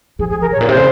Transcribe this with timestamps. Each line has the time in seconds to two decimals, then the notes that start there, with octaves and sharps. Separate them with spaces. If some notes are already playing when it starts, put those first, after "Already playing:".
0.19 F3 G#4
0.30 G#4
0.41 A#4
0.52 G#2 C#5
0.61 A#2
0.69 C3 C5
0.77 C#3